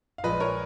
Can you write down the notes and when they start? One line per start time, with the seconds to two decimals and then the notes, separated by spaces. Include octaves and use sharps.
0.18 F5
0.23 A#1 A#2 F3 G#3 B4 D#5
0.40 A#4 C#5